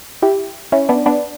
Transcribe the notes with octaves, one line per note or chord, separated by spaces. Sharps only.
E4 G4
C#4 E4
B3 D4
B3 D4